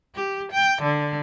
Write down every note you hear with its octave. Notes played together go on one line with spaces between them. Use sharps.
G4
G5
D3